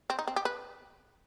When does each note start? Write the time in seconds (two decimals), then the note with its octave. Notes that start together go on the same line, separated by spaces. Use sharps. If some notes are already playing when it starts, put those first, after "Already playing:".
0.10 C4
0.19 D#4
0.27 C4
0.36 G4
0.45 B4